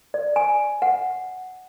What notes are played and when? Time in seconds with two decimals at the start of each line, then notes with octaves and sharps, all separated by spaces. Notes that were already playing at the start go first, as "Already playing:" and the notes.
0.14 D5
0.36 G#5
0.82 F#5